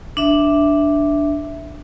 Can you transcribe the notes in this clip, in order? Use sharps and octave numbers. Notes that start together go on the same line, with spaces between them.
D4 E5